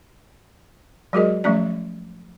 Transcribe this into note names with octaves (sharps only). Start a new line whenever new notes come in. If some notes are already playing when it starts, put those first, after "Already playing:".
F#3 G#3 F#4 G#4 A#4 D#5
F3 G3 A3 C#4 D5